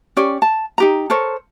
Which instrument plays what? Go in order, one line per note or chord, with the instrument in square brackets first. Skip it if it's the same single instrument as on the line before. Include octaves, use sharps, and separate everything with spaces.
[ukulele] C#4 G4 C#5 D5
A5
D#4 G4 A#5
A4 A#4 C5 C#5